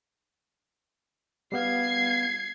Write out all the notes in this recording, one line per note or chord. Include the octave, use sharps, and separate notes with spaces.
G3 B3 F5 G#6 C7